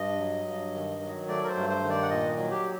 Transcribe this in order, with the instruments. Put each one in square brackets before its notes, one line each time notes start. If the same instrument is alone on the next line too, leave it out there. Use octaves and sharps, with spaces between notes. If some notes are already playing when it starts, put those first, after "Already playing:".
Already playing: [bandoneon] G2 D#5
F#3
G2
D#3
F#3
A3 D5
A#4
C5
G2
C5
D#3
D5
F#5
A#2 D#5
F#3
G4